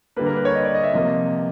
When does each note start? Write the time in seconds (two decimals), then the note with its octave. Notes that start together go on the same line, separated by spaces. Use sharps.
0.16 D3 G3 A#3 B4
0.26 A#4
0.36 B4
0.45 C#5
0.55 D#5
0.65 D5
0.74 D#5
0.83 E5
0.93 C3 F3 A#3 D#5